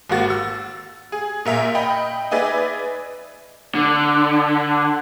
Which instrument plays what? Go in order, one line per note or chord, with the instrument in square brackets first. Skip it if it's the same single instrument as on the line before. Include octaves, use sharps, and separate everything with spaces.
[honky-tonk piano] G#1 A#3 F#4 A6
E6
G#4
A#2 A#4 E5
D#5 G5 B5
D#4 G#4 B4 D5 E5
[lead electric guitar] D3